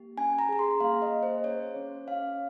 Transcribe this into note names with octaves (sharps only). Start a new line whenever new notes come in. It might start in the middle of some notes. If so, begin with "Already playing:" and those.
Already playing: A#3 G4
C#4 G#5
A#5
G#4 A#5
C6
A#3 F5
D#5
G#4
C5
C#4 C#5
C#4
C#4 F5